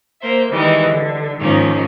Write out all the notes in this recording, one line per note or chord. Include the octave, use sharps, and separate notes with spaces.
A#3 C5 E5
D#3 E3 G3 G#3
D3
G#2 D#3 F3 A#3 C#4